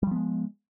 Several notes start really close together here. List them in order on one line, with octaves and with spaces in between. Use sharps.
G3 F3 B3 G#3